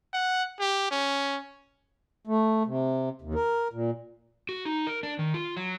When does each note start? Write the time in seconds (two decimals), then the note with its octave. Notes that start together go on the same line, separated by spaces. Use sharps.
0.14 F#5
0.60 G4
0.91 C#4
2.27 A3
2.66 C3
3.22 D#2
3.34 A#4
3.73 A#2
4.49 F#4
4.65 D#4
4.87 A#4
5.03 D4
5.19 D#3
5.34 F4
5.56 F#3